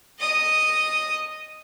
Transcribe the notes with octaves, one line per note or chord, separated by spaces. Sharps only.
D#5 D#6